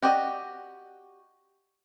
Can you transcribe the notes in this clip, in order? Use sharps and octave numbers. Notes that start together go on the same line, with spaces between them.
F#4 G4 D5 D#5